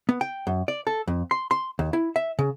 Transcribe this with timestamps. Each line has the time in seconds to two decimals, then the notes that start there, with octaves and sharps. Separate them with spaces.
0.09 B3
0.21 G5
0.47 F#2
0.68 D5
0.87 A4
1.07 F2
1.31 C6
1.51 C6
1.79 D#2
1.93 E4
2.16 E5
2.39 C#3